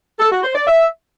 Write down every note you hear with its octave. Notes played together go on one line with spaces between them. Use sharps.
A4
F#4
C5
D5
E5